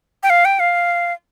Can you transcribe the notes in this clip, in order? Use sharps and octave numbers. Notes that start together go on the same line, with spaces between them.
G5
F5
G5
F5